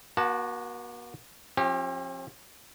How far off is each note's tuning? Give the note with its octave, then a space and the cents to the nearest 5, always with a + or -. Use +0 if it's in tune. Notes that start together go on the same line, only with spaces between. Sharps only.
A#3 +45 F#4 +0 A5 +0
F3 +15 C4 +45 G4 +0